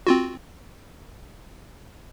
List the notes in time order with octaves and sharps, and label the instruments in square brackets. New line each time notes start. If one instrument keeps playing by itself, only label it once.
[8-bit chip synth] C4 F4 F#4